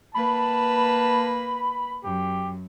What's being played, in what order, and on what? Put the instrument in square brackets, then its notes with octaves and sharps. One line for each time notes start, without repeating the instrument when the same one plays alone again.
[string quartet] A#3 B4 [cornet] A5 [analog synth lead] B5
[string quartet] F#2 [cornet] G4